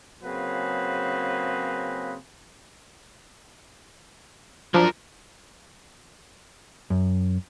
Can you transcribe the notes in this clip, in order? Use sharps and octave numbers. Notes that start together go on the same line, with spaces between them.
C#3 F#3 A#3 C4 G#4 B4
F3 F#3 D4 F4 A#4
F#2